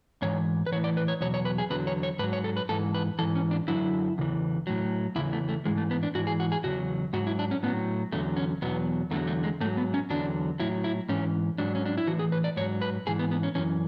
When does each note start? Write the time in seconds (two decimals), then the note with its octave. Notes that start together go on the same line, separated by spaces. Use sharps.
0.22 G#2 E3 C#5
0.66 B4
0.72 E3 C#5
0.76 A2
0.84 D5
0.97 B4
1.08 C#5
1.21 E2 B2 F#3 C#5
1.34 C#5
1.45 B4
1.58 G#4
1.70 E2 D3 F#3 B4
1.87 C#5
2.03 C#5
2.19 G#2 B4
2.24 F#3
2.33 C#5
2.44 A4
2.57 B4
2.69 G#2 E3 A4
2.94 B4
3.19 G#2 E3 A4
3.35 C#4
3.51 D4
3.68 F#2 D3 F#3 E4
4.18 E2 C#3 E3
4.67 A2 F#3
5.16 E2 C#3 E3 E4
5.33 A3
5.49 A3
5.65 G#2 E3 G#3
5.78 A3
5.91 B3
6.03 D4
6.15 G#2 F#4
6.19 E3
6.27 G#4
6.40 F#4
6.52 G#4
6.64 E2 C#3 F#3 F#4
7.13 G#2 F#3 F#4
7.27 E4
7.39 D4
7.51 C#4
7.63 A2 B3
7.67 F#3
8.12 E2 D3 F#3 A3
8.37 C#4
8.62 E2 B2 F#3 B3
9.11 E2 D3 F#3 A3
9.27 A3
9.44 G#3
9.60 G#2 A3
9.65 F#3
9.77 B3
9.94 C#4
10.10 E2 D3 F#3 D4
10.60 A2 F#3 E4
10.84 E4
11.09 G#2 E3 C#4
11.58 G#2 F#3 D4
11.75 C#4
11.86 D4
11.97 E4
12.07 E3 F#4
12.12 A2
12.19 G#4
12.32 B4
12.44 D5
12.57 G#2 C#5
12.61 F#3
12.82 B4
13.07 G#2 E3 G#4
13.19 B3
13.31 B3
13.43 C#4
13.55 F#2 E3 C#4